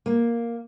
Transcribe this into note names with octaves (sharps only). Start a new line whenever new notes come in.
A#3